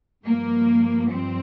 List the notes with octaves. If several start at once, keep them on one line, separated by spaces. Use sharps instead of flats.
G2 F3 A#3
C4